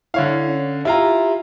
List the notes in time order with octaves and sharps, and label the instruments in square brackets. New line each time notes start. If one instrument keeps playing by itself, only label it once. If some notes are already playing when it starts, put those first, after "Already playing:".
[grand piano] D3 C#5 F5 [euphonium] E4
[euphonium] C#4
[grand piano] E4 F4 A#5 [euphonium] G4